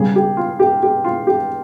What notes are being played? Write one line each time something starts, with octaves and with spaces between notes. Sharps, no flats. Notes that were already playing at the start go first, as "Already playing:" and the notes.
Already playing: C#3 G3 C#4 G#4
G4
F4
G4
G4
F4
G4